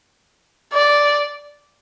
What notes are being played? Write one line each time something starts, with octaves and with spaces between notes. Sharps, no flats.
D5